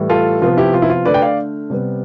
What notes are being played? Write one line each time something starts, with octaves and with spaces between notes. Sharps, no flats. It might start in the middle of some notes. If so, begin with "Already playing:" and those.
Already playing: A2 E3 G3
F4 A4
C3 F3 B3 F4
E4 G4
F4
E4
F4
D3 A3 B4 D5
G5
D5 F5
C3 G3 B3